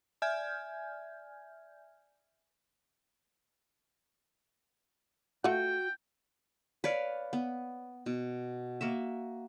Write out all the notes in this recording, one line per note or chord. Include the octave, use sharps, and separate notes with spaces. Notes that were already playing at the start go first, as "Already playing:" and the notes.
D5 E5 G#5 F6 G6 G#6
A3 F4 F#4 F#5 G5
B4 C#5 D5 F5
B3
B2
A#3 F#4 E5